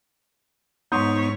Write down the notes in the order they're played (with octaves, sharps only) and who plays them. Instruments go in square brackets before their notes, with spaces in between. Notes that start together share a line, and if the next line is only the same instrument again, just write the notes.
[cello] G#2 C#5 [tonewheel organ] B3 D#4 [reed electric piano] C6 D#6 G6